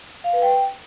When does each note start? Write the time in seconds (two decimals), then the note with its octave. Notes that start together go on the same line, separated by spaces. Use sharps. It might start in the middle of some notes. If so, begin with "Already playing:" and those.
0.24 F5
0.33 B4
0.42 G5